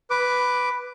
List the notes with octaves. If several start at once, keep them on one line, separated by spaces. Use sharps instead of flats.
B4 D6